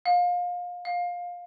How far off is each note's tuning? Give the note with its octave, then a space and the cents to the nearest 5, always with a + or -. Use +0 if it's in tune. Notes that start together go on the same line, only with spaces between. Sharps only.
F5 +30
F5 +20